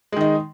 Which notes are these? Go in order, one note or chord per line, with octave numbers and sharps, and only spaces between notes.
D#3 G#3 D#4